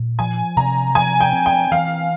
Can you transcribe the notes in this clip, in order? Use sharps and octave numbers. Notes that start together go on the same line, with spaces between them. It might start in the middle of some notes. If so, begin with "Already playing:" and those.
Already playing: A#2
F3 G#5
C3 A#5
F3 G#5
G5
C4
G5
E3 F5